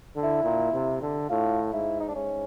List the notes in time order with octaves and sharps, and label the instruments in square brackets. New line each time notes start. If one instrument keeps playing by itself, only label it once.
[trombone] D3
[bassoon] E4
[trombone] A#2
C3
D3
[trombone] A2 [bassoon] F4
[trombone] G#2 [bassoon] E4
[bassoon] D#4
D4
[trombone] G#2 [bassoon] C#4